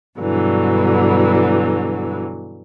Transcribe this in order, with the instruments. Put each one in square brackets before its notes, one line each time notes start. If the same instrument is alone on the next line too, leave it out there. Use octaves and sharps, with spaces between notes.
[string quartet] G2 B2 D3 E3 F#3